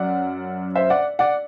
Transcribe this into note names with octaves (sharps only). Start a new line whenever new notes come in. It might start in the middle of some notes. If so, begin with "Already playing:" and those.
Already playing: F#2 D5 F#5
C5 E5
D5 F#5
D5 F#5